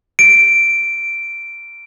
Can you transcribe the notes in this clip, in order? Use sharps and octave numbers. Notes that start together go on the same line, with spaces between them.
D7